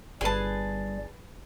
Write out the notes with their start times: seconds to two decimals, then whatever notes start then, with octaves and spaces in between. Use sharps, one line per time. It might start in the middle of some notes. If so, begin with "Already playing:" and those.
0.21 G1 G3 G#4 B4 G#5 A5 C6